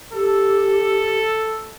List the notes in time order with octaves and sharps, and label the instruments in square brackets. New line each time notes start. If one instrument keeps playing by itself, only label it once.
[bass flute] G4 [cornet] A4